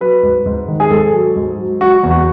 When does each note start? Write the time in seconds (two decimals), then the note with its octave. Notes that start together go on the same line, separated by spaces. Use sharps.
0.01 F#3 B4
0.23 G#2
0.46 G#2
0.68 D#3
0.80 G#4
0.90 G#2 A4
1.13 F#3
1.36 G#2
1.58 F#3
1.81 F#3 F#4
2.03 E2
2.11 F#4